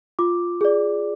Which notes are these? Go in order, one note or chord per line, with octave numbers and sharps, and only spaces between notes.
F4 D6
G#4 D5